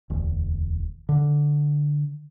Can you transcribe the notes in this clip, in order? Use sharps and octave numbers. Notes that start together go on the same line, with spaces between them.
E1 D2
D3